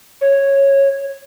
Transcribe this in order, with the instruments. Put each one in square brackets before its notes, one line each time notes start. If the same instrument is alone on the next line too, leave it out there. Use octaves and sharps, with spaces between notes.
[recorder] C#5